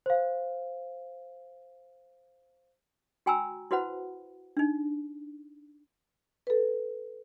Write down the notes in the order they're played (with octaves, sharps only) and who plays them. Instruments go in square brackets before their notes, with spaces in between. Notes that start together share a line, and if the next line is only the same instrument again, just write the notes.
[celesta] C5 F5
[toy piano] F#4 G5 G#5 A#5 B5 E6
E4 F#4 B4 C5 F#5 B5
D4 D#4
[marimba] A4 B4